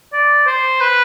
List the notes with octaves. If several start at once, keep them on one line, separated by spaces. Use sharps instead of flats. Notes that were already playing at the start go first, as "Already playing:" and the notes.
D5
C5
B4